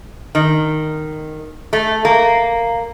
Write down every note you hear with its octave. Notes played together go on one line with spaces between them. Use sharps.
D#3
A3
A#3